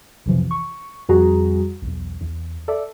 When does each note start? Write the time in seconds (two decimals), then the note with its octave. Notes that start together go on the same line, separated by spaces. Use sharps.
0.26 B1 F2 C3 E3 F3
0.51 C#6
1.09 F2 G3 F#4 G#4 A#5
1.82 B1 E2
2.21 E2
2.68 A4 D5 E5